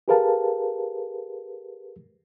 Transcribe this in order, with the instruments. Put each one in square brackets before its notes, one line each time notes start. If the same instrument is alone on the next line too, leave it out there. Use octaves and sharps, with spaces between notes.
[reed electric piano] G4 G#4 A#4 B4 F5 A5